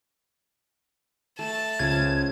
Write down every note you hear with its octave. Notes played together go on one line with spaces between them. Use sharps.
A3 A5
C#2 C#3 F3 G#6